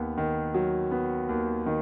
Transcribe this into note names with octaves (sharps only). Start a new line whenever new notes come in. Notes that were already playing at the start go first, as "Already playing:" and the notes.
Already playing: D#2 B3
D#3
F#3
B3
D#2
D#3